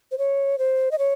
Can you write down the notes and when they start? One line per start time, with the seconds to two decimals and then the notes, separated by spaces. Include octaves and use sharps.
0.12 C5
0.18 C#5
0.58 C5
0.91 D#5
0.99 C#5